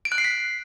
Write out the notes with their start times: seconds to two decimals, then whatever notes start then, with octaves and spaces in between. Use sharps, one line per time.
0.05 D7
0.12 F#6
0.18 C7
0.24 B6